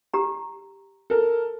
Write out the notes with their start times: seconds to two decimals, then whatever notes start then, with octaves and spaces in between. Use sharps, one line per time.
0.14 G4 A#5
1.10 A4 A#4